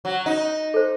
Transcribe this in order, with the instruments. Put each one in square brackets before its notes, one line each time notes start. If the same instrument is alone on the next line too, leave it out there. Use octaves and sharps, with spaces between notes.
[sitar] F#3
D#4
[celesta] A4 C5